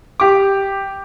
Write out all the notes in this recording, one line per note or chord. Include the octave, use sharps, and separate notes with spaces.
G4 D6